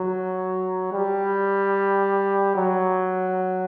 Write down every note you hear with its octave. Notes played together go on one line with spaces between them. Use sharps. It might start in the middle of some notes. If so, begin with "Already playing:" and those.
Already playing: F#3
G3
F#3